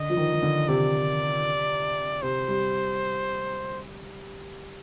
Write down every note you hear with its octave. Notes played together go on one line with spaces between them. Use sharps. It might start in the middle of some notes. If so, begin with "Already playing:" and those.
Already playing: D3 D#5
F3
D#3
D#3
D3
C3 D5
C3 C5
G3